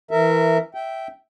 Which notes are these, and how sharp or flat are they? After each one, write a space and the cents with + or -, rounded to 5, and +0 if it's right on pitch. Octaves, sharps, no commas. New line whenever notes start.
E3 -5 A#4 -20 E5 +0
E5 -5 G5 -15